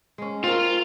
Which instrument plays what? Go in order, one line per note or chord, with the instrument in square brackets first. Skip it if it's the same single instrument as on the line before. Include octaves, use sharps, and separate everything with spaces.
[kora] G#3 C#4
[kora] C4 A#4 [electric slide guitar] F4